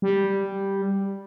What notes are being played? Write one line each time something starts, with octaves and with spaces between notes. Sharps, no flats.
G3